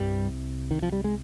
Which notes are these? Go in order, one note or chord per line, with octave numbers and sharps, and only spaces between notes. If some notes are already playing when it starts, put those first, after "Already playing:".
Already playing: C2 G2 C3 G3
D#3
F3
G3
G#3